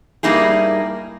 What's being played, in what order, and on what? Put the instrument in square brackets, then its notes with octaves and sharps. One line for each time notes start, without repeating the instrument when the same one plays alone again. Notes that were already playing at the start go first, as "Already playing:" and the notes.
[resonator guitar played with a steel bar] G2 G3 A#3 D#4 E4 G#4